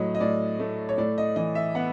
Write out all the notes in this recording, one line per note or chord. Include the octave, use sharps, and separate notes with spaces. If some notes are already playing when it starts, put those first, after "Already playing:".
Already playing: A2 F#3 D#5
D#5
A2 D5
A3
C#5
A2 D5
D#5
E3 D#5
E5
B3 F#5